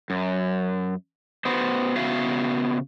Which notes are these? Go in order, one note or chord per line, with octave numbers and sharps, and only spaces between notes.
F#2
B3 F#4 C5
C#3 B3 F#4 E5 F5